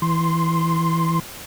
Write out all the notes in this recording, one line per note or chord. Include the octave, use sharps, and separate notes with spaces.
E3 C6